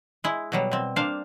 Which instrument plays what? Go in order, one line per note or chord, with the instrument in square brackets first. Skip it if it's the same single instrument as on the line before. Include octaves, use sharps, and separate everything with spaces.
[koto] G#3 E4
B2 F#3 G3
B2 C4
A#3 D4 C5 F5